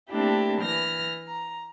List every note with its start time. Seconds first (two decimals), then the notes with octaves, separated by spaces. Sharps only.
0.10 A3 A#3 C4 D4 E4 G4
0.61 E3 F6 A#6
1.28 A#5